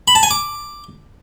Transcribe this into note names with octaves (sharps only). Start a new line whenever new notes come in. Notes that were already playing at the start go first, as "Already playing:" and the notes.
B5
A5
G#5
D6